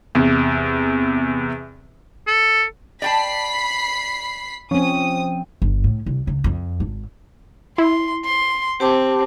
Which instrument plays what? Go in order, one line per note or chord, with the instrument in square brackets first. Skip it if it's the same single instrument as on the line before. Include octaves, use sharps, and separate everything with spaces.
[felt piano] E2 C3
[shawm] A4
[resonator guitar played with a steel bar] D5 G5 A5 [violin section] B5 B6 C7
[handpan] F3 C4 [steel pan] C#4 [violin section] D#6
[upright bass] G1
A2
C2
C#2
F2
G#1
[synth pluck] E4 [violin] C6
[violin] C6
[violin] C4 [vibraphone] G4 A5 D6